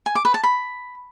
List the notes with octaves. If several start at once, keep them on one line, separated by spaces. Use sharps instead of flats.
G#5
D6
B4
A5
B5